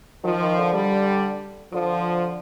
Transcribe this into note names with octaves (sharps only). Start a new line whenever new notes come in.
D#3 F3
D#3
D3
G3
D3 F3